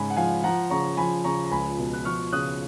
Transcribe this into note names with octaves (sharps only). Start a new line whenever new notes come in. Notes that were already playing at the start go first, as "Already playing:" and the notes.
Already playing: G#2 C#3 G#5 B5
F#5
F3 F5 G#5
F3 F#5 A#5
C#3 A#5 C#6
F3 G#5 B5
C#3 A#5 C#6
A#5
C#2 G#5 B5
B2
F#6
F3 C#6 F6
C#3 D#6 F#6